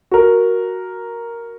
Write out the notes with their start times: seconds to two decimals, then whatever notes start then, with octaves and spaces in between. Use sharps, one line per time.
0.11 F#4 A#4